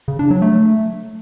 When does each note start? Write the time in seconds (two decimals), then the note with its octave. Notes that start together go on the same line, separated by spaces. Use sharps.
0.08 C#3
0.19 D4
0.31 F#3
0.42 A3